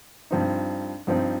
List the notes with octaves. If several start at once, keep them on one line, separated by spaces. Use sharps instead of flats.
G2 F3 C4 D#4
G2 F3 C4 D#4